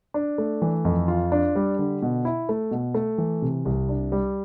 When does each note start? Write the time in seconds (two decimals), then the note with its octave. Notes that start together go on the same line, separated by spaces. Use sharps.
0.14 D4
0.38 A3
0.62 E3
0.85 F2
1.08 F4
1.32 D4
1.56 G3
1.79 D3
2.02 B2
2.25 E4
2.49 A3
2.71 B2
2.95 A3
3.18 E3
3.42 C3
3.65 C2
3.89 D4
4.12 G3